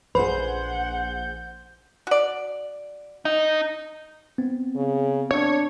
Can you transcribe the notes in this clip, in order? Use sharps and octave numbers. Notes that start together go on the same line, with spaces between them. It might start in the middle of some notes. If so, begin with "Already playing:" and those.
A#1 G#4 B4 C5 F#5 G6
F#4 D5
D#4
B3 C4
C#3
D4 C#5